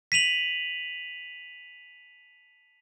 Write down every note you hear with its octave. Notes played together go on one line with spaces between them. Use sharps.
B6 D#7 F7 F#7